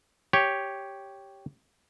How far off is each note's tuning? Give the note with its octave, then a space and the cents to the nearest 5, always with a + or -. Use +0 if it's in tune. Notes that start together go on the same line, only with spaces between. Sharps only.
G4 +0 C#5 +0